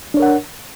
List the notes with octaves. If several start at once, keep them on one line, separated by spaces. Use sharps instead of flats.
D4 A#4 C#5 F#5